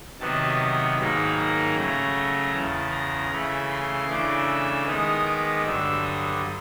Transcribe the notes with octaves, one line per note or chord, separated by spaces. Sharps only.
C3 D#3 F#3 B3 A5
G#2 D#3 F#3 A#3 D#4 B5
A#5
C#3 F#3 A3 A#5
E2 C#3 E3 A5
A#5
C#3 E3 A3 B5
C6
C#3 E3 A3 D4 D6
E6
D#3 G#3 B3 D#4 D#6
D6
G2 D3 F#3 E6
D#6